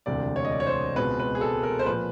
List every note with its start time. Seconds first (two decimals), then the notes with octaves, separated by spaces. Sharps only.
0.06 E1 D2 C3 D5
0.36 C#5
0.45 D#5
0.52 D5
0.60 C#5
0.67 C5
0.96 C#2 B2 G#3 C4 B4
1.19 B4
1.35 G#4
1.41 A4
1.63 A#4
1.79 C5
1.86 A#2 F3 B4